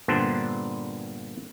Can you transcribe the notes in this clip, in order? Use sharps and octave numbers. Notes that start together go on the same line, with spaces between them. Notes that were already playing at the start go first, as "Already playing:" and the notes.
G2 A#2 D3 B3 D4 C5